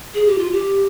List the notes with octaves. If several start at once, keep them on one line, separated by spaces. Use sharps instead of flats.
G#4
G4
F4
G4